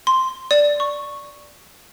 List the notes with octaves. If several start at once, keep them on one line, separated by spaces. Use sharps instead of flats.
C6
D5
C#6